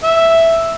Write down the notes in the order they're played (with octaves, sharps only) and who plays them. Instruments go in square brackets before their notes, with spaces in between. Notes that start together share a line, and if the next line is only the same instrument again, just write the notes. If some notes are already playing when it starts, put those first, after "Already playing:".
[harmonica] E5